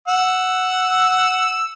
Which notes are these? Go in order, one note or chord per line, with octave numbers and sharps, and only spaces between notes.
F#5 E6